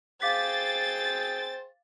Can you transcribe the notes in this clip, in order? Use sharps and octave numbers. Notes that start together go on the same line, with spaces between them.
G#4 C5 F5 G5 D6 A6 B6